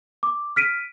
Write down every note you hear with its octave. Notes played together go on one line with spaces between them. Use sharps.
D6
F6 B6 D7 D#7